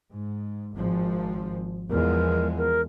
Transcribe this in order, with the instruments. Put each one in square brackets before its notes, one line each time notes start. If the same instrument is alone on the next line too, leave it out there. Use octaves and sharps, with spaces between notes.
[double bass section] G#2
G#1 G#2 F3
[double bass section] E2 F3 G#3 [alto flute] A#4
[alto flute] A#4